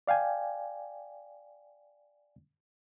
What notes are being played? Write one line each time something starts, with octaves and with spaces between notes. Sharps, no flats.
D5 F5 G5 G#5